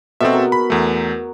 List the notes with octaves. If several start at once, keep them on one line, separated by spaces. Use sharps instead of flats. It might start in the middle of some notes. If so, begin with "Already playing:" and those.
B2 C4 A4 E5
A#4
B5
E2 A3